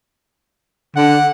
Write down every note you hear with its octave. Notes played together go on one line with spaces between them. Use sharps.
D3 F#5